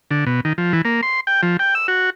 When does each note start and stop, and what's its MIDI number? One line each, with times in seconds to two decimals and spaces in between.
0.11 0.25 50
0.27 0.40 47
0.45 0.53 51
0.58 0.73 53
0.73 0.82 52
0.85 1.01 58
1.03 1.20 84
1.27 1.41 79
1.43 1.57 53
1.59 1.75 79
1.75 1.87 88
1.88 2.10 66